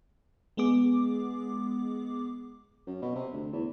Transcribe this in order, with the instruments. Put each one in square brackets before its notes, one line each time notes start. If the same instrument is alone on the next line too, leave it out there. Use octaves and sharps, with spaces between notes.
[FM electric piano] G#3 B3 G#4 D6
[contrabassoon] F#2
B2
C3
D2
E2